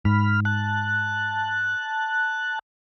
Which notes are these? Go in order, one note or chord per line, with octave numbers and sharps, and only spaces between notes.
G#2 B5 F6
A5 F#6